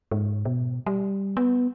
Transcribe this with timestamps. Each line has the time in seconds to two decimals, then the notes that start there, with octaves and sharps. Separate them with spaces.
0.11 G#2
0.45 B2
0.86 G3
1.37 B3